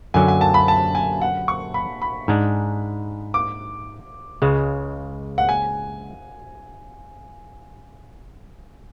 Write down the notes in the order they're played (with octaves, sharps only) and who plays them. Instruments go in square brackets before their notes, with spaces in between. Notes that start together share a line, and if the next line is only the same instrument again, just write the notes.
[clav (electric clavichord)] F#2 D3 F#3 [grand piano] G#5
[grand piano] G#5
A5
B5
A5
G#5
F#5
C#6
B5
B5
[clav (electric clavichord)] G#2 G#3 D4
[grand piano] D6
[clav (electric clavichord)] C#2 C#3 G#3
[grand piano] F#5
G#5